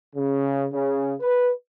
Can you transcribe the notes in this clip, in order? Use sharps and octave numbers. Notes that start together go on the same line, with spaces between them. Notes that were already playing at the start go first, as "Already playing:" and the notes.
C#3
C#3
B4